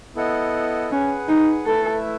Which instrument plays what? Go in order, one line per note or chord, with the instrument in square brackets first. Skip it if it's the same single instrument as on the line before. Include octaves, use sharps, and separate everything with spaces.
[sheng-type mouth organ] B3 E4 A4 D#5 F#5
[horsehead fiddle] C#4 [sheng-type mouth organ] G#4 B4 F#5
[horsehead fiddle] D#4
[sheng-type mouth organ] A3 E4 B4 E5 [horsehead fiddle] A4